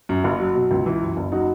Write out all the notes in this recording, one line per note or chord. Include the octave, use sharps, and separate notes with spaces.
F#2
F#1
F#3
B2
C#2
E3
F#2
F#1
F#3 D#4 F#4